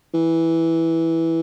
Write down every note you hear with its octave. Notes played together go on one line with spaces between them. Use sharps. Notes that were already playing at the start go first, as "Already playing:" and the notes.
E3